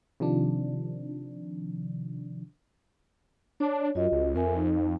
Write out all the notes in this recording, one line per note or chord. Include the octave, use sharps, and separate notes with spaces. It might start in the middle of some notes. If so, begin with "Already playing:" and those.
C3 D#3 F3 D4
D4 C#5
F#2 F4 F#4 D#5
C#2
F2 A#4 E5 G#5
D#4